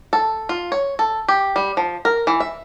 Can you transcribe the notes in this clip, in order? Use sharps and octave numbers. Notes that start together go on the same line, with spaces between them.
A4
F4
C#5
A4
G4
G3
F3
A#4
E3
E5